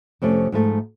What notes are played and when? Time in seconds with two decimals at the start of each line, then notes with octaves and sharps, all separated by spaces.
0.22 F2 C3 F3 A3 C#4
0.52 G#2 F3 A3